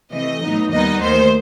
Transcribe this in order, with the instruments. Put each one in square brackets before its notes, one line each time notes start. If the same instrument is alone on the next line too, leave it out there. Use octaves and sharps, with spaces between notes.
[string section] C3 E3 A3 D#5
A2 F#3 B3 D#4
D#2 D#3 G3 B3 D#4 D#5
D#2 D#3 A3 C5